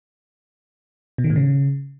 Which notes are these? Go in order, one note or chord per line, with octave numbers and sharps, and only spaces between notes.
B2
D#3
A2
C#3